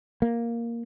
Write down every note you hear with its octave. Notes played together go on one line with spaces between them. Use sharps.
A#3